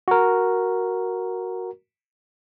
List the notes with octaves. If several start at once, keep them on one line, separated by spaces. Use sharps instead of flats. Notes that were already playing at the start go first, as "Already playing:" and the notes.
F#4 A#4